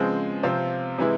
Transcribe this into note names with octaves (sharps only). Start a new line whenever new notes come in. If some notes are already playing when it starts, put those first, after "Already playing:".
Already playing: C#3 F3 G#3 C4
C3 F3 C4 F4
C3 E3 G#3 E4